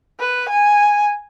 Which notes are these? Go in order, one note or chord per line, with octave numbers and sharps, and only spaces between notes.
B4
G#5